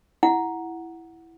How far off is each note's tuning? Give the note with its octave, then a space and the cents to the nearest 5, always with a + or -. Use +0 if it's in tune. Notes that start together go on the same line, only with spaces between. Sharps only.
E4 +5 F#5 +0